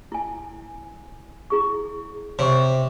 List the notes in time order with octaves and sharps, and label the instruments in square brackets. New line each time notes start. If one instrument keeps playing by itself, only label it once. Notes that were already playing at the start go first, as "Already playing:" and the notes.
[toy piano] E4 G#5
E4 G#4 C#6
[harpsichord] C3 [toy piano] C#5 C#6